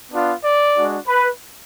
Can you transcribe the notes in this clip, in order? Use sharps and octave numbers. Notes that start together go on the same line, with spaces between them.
B3 D4 F4
D5
G#3 D4 F#4
B4